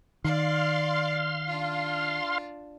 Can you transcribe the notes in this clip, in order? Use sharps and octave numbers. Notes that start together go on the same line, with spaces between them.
D#3 D5 F5 C6
D4 F4